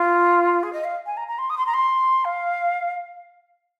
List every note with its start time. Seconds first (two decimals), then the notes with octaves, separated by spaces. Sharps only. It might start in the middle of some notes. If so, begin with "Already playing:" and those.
Already playing: F4
0.63 G#4
0.73 D#5
0.84 F5
1.06 G#5
1.17 A#5
1.28 A#5
1.38 C6
1.50 D#6
1.58 C6
1.66 A#5
1.74 C6
2.25 F5